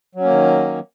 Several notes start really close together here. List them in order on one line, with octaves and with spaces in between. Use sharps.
F#3 C#4 A#3 D#3